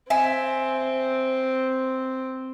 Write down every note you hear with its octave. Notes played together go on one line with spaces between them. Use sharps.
C4 E5 G#5